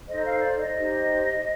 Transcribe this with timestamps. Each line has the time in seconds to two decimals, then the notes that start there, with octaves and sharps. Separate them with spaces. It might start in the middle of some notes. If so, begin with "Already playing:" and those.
0.09 D#4 A4 C5 D#5
0.25 F5
0.42 D5
0.59 D#5
0.76 D#4 G4 C5